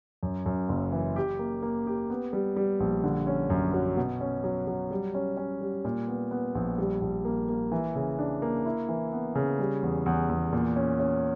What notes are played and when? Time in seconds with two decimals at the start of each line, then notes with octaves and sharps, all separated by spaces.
0.23 F#2
0.46 F#2
0.69 F#1
0.92 E3
1.16 G4
1.39 A#3
1.63 A#3
1.87 G4
2.10 B3
2.33 G3
2.56 G3
2.80 A#1
3.04 D3
3.27 C#4
3.50 F#2
3.74 F#3
3.97 B2
4.21 C#4
4.44 F#3
4.67 F#3
4.91 G3
5.14 C#4
5.37 C#4
5.61 G3
5.85 A#2
6.08 B3
6.31 B3
6.55 A#1
6.78 G3
7.01 A#1
7.25 A#3
7.49 A#3
7.72 E3
7.95 C#3
8.19 D4
8.42 A#3
8.66 E4
8.89 E3
9.12 B3
9.35 C#3
9.59 G3
9.83 E2
10.06 E2
10.29 E2
10.53 A#2
10.76 C#4
11.00 C#4